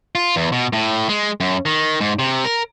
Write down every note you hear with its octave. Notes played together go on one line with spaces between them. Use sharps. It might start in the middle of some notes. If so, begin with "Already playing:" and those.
F4
E2
B2
A2
G#3
F#2
D#3
G#2
C3
A#4